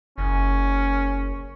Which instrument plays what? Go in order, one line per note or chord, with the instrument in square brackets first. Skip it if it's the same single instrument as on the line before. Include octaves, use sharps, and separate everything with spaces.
[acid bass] F#1 [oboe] C#4